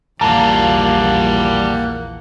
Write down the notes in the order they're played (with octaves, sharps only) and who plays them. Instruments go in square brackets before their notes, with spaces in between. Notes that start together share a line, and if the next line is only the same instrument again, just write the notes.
[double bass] A#1 E2 [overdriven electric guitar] G3 F4 [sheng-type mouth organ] A#3 F#5 [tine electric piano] A5 A#5